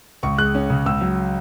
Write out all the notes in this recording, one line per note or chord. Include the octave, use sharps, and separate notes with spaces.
C#2 C#6
G#3 F#6
C#4
C#3
C#2 E6
F#3